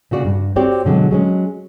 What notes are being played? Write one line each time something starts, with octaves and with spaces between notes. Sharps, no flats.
A#2 C#3 F#4 D5
G2
C4 F#4 G4 C#5 D5
B2 D3 F#3 G#3
F#3 G#3 C#4